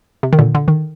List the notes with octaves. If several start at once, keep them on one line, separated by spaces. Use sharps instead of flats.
C3
D#3
A#2 D3
D3
D#3